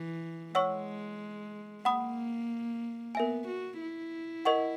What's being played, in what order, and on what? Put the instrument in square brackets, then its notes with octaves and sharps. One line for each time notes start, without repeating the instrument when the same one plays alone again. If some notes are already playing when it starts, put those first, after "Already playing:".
Already playing: [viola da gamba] E3
[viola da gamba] G#3 [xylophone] C#5 F#5 C#6 E6
[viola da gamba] A#3 [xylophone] F#5 B5 D#6
[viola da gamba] B3 [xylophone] A#4 E5 G#5
[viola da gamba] F#4
E4
[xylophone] A#4 D#5 F#5 C#6